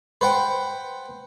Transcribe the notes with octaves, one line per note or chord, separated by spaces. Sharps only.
B4 C5 F#5 G5